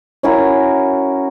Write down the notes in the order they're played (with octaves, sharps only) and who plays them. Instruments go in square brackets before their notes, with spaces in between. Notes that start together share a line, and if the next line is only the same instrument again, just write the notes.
[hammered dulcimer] C#4 E4 F#4 A#4